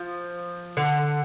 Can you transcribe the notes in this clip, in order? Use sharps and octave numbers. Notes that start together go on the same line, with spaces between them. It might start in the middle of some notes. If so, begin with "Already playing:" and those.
Already playing: F3
D3